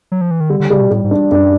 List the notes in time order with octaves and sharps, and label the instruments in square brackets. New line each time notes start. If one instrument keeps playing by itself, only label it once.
[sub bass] F#3
F3
E3
D#3
[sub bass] D3 [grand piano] G3
[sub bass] D3
[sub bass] C#3 [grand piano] G3
[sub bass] B2
[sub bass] A2 [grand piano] G3
[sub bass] G#2
[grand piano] D4
[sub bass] F#2 [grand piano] D4